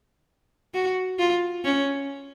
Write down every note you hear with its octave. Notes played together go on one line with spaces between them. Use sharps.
F#4
F4
C#4